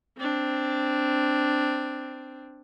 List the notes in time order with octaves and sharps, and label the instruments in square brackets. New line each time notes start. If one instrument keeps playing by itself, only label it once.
[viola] C4 D4